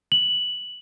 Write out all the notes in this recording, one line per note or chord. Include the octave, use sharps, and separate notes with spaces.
F#7